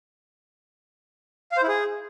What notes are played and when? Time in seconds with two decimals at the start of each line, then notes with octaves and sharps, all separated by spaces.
1.52 F5
1.57 C5
1.63 E4
1.68 G#4